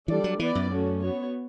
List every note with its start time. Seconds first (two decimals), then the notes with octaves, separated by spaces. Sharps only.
0.08 E3 G3 D4 A4 D5
0.24 F#3
0.40 E3 B3 E4 B4 D5
0.55 F#2
0.70 A3 C#4 F#4
1.00 B3 F#4 C#5